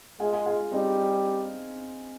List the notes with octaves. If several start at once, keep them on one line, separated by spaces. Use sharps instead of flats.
G#3 F4 G#4
F4 G#4
F4 G#4
G3 C4 D#4